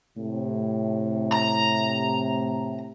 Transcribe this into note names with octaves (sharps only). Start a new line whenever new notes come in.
A2 C3
A#5